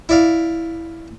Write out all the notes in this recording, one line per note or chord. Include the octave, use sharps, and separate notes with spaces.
E4 D5 F5